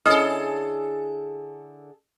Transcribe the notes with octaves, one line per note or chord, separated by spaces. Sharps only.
D3 C#4 E4 G#4 A4 D#5 D#6 F6